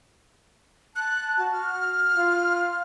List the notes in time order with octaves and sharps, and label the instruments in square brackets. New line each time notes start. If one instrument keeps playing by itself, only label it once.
[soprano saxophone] A5 [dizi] F#6
[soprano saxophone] F#4 [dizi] A5
[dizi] F6
[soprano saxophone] F4